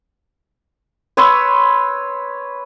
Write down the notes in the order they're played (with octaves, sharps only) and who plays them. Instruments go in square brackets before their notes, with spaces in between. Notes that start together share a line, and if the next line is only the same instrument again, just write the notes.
[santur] B4 C#5 C6 E6